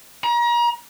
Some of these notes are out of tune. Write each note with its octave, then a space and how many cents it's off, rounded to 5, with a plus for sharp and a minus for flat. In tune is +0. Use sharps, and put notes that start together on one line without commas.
A#5 +35